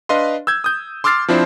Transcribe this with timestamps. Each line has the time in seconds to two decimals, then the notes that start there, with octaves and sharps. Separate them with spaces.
0.09 D4 B4 D#5 F5 C6
0.47 E6 G6 G#6
0.64 D#6 G6
1.04 C6 D6 E6 F6 A6 C7
1.28 F3 C4 D4 E4 C5